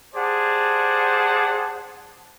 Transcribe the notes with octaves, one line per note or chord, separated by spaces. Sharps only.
G4 G#4 C5 D5 F#5 A5